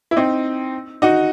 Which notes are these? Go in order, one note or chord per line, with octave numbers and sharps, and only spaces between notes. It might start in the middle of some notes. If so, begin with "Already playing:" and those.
E4
C4 D#4
D#4 F#4